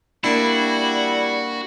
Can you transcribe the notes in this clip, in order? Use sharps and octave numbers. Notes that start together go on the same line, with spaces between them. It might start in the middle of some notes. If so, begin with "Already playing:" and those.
G3 A#3 D4 E4 F#4